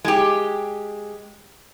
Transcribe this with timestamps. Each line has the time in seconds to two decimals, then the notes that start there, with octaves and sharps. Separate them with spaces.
0.04 G#3 G4